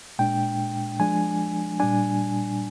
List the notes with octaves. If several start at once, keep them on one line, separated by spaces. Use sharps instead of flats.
A#2 G#3 D4 G5
F3 G#3 D4 G#5
A#2 G3 D4 G#5